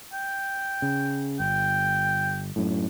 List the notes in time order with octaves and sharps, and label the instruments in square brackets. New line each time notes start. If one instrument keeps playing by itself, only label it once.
[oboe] G5
[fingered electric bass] C#3
[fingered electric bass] G1 [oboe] G5
[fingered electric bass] F#2 A2